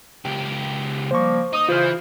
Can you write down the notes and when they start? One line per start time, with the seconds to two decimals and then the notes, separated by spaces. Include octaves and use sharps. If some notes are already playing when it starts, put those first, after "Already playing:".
0.25 C#2 G4
1.11 F3 G3 A#3 C5 C#6
1.53 D#4 D#6
1.69 C#3 E3 F4 C5 F6